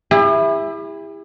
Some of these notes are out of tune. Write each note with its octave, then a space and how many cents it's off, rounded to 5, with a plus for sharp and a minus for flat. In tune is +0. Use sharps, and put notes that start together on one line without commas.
E4 +0 G4 +45